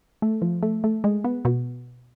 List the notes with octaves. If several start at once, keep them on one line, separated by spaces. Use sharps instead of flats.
A3
F3
A3
A3
G#3
B3
B2